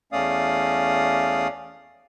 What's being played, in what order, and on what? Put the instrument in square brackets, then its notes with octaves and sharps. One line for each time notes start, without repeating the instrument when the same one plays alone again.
[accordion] E2 A3 C#4 D5 F5 D#6